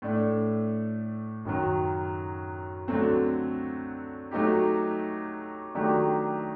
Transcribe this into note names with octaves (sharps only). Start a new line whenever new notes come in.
A2 A3 D4
F#2 D#3 F#3
D3 F#3 A3 C4
F#3 A3 D#4 G4
D#3 F#3 A3 D4 G4